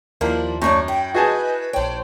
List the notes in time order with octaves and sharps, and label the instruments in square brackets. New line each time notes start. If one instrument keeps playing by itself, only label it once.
[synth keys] D#2 [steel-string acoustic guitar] F3 D4 E4 [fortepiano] A#3
[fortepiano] F#2 [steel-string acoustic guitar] A3 D4 C#5 [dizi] C#6
[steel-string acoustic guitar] E4 [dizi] G5
[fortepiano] F#4 G#4 A5 [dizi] B4 [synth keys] D#5 G#5 G6
[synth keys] A#1 C#5 [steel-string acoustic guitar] D4 G5 [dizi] C5